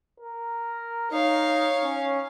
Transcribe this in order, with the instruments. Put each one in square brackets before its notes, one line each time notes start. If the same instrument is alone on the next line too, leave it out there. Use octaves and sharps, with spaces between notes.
[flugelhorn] A#4
[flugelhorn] D#4 [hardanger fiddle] C#5 F5
[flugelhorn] C#4